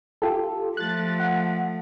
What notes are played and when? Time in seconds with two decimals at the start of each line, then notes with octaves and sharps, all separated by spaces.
0.22 F4 G4 A4
0.77 F3 A3 F#6 A6
1.20 F#5